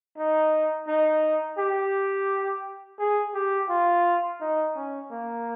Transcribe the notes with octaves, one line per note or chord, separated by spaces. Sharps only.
D#4
D#4
G4
G#4
G4
F4
D#4
C#4
A#3